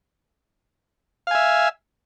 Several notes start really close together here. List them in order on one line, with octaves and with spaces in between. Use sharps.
F5 G#5 E5